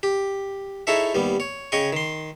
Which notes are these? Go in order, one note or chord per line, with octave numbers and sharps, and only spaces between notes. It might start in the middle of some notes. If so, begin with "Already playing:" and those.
G4
D#4 E4 G#4 A4 C#5 E5
D#2 G3 B3
C#5
C#3 C#5 D#5 G5 C#6
D#3 C6